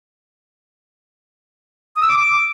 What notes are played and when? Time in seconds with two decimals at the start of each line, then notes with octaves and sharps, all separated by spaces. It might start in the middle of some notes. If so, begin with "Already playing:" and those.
1.96 D#6
2.02 E6
2.08 D6